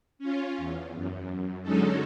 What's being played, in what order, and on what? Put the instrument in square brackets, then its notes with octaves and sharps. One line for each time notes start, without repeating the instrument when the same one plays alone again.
[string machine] C#4 F4
E2
F#2
D3 F#3 G#3 C#4 D#4 A4